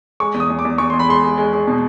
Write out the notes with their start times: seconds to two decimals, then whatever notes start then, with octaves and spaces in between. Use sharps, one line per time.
0.20 G#3 C#6
0.34 E2
0.40 D#6
0.50 E2
0.59 D6
0.65 E2
0.78 E2 C#6
0.90 E2 C6
0.99 B5
1.08 G#3 C6
1.24 G#3
1.38 G#3
1.53 G#3
1.68 B2